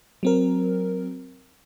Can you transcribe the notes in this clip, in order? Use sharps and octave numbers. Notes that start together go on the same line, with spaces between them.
F#3 C4 A#4